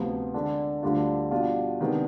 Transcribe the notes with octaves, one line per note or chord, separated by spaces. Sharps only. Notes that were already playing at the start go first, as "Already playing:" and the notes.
Already playing: D2 C3 F3 B3 F4
D3 G#3 D4
D2 D3 G3 D4 F4
B2 G3 D4 F4
C3 D#3 G#3 B3 D4